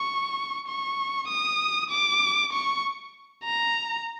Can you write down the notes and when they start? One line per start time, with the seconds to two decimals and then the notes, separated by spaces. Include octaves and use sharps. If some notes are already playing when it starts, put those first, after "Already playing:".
Already playing: C#6
0.68 C#6
1.28 D#6
1.90 D6
2.53 C#6
3.45 A#5